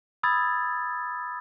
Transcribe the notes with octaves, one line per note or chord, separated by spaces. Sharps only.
B5 D#6 E6 G#6 A6